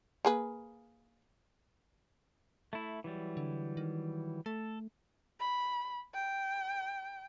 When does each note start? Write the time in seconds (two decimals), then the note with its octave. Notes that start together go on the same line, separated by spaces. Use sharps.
0.25 A#3 G#4 B4
2.73 A3 E4
3.04 E3 F#3 G3
3.37 D3
3.77 D#3
4.46 A3 A4
5.40 B5
6.14 G5